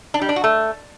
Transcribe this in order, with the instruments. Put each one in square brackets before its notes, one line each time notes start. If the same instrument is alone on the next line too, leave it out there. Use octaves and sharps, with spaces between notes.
[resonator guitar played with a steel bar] D4
G3
D4
F#4
A3